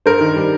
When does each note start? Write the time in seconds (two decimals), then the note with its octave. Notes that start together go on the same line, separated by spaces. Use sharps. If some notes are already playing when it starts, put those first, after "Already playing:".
0.06 G2 A#4 C5
0.21 D#3
0.36 G3